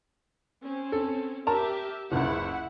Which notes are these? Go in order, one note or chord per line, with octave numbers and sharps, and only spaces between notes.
C4 C#4
A4
G4 A#4 E5 A5 A#5
F#1 C#2 E4 F#5